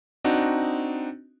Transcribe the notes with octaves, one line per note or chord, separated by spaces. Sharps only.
C4 D4 D#4 F#4